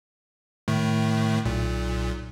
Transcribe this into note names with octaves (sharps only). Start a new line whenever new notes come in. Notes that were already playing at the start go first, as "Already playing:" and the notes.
A2 D#3 A3
B1 A#2